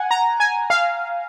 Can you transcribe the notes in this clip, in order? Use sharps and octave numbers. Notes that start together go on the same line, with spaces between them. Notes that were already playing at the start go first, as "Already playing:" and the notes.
Already playing: F#5 G#5
A#5
G#5
F5